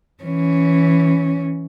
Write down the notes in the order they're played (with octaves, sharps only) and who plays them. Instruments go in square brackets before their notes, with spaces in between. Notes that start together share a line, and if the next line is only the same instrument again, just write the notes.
[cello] E3 C#4